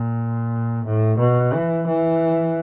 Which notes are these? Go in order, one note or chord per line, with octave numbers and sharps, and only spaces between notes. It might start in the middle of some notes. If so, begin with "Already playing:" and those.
Already playing: A#2
A2
B2
E3
E3